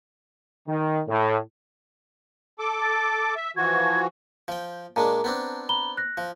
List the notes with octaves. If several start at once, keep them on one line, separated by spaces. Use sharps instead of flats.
D#3
A2
A4 D6
A6
E5
E3 F3 F#4 G#6
F3 G5
A#2 G#3 D4 A5 A#5
B3 C4 D4
A#5 B5 G7
F#6 A#6
F3